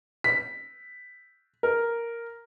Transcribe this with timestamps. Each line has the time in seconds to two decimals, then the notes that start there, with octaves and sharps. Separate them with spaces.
0.24 B6
1.63 A#4